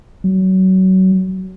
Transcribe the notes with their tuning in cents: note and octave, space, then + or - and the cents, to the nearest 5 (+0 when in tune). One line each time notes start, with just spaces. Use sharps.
F#3 +25